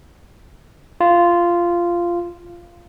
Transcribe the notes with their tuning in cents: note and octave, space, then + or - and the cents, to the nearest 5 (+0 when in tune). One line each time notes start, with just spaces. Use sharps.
F4 -10